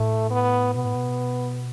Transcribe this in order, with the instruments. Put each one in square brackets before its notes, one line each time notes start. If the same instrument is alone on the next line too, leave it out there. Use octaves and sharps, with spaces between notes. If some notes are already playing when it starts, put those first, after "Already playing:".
Already playing: [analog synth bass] A2 [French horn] A3
[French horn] B3
[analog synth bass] B2 [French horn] B3
[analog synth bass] A2
B2